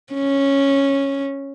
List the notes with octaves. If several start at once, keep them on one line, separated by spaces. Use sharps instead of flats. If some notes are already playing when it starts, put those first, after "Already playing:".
C#4